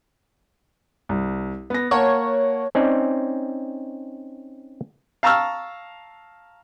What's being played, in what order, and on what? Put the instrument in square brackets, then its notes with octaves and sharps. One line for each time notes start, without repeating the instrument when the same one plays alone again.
[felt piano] C2
B3 A#6
[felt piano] A#3 F#5 A5 [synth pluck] C#5
[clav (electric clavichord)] C4 C#4 D#4 D5
[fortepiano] F5 A5 A#5 C#6 E6 F6